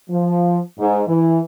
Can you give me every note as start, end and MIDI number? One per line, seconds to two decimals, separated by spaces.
0.10 0.59 53
0.79 1.02 44
1.08 1.39 52